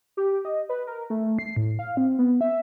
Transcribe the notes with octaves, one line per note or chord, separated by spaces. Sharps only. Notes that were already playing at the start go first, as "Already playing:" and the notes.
G4
D#5
B4
A#4
A3
C7
A2
F5
C4
B3
E5